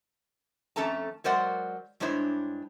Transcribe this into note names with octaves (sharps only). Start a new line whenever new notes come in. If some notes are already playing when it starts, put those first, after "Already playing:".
F2 A3 C#4 A4 A5 A#5
F#3 G#3 A#4 C5 D5 F#5
G2 G#3 D4 E4 C5 C#5